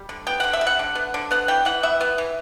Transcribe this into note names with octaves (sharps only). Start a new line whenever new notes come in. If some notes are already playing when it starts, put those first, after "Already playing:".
Already playing: G3
D3
B3 G5
D3 F#5
E5
G3
F#5
D3
B3
D3
B3 F#5
E3 G5
E3 F#5
B3 E5
B3
E3